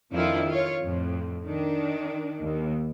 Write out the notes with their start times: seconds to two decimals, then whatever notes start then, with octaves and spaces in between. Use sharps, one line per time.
0.11 F2 D#3 F3 D4 E4 F4
0.48 F4 C#5
0.81 F2 A2
1.43 D#3 D4
2.39 D#2